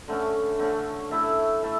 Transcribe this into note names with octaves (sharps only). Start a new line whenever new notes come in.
D3 A3 C#4
D3 A3 C#4
A3 E4 A4 E5
A3 E4 A4 E5